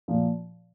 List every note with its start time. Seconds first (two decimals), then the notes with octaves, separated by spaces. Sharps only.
0.08 A#2 F3